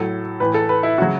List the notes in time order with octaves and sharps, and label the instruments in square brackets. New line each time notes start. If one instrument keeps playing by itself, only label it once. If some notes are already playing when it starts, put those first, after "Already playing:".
Already playing: [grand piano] A2 F#3 A4
A2 E3 B4
A4
B4
E4
C#3 F#3 F#4